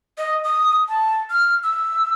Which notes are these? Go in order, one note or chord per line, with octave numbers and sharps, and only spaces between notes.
D#5
D#6
A5
F6
E6